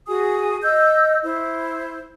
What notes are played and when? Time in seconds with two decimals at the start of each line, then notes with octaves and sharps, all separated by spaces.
0.07 F#4 G#4 G#5 D#6
0.63 D#5 E6 G6
1.24 E4 C5